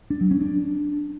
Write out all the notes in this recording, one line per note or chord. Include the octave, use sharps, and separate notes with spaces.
D4
F#3
C#4
D4